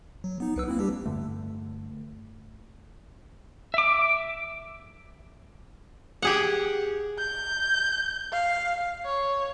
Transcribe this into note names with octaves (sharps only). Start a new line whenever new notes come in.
F#3
B3 D#4
C#2 B4 E6
A#3 C4 E4
G3 D4 G4
G2 D3 A3
E5 D6
G4 G#4 F#5
G6
F5
C#5